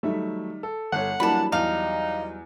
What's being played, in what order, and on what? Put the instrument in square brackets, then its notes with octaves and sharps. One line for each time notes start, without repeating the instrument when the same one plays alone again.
[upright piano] D#3 G3 [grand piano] F#3 A3 E5
[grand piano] A4
[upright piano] G1 C#5 [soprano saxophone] F#5
[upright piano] E3 A#3 D4 [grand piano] F#3 G3 E4 [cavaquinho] A5 B5
[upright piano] E2 [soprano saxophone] D#4 [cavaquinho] F5